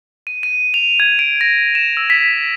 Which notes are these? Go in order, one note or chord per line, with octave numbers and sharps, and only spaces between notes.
D#7
D#7
F7
G#6
D7
A#6
E7
E6
B6